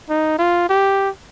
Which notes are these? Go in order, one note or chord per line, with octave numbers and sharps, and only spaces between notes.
D#4
F4
G4